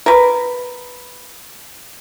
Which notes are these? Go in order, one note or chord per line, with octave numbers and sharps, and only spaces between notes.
A#4 B4